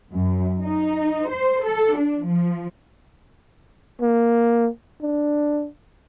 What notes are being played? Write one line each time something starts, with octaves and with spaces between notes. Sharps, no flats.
F#2
D#4
C5
A4
D4
F3
A#3
D4